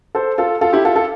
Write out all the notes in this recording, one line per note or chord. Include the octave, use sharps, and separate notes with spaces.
A4 C5
F4 A4
F4 A4
E4 G4
F4 A4
F4 A4